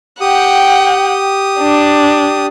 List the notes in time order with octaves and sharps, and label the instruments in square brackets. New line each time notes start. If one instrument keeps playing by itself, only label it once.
[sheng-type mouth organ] G4 D#6 [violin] F#5 G5
[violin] D4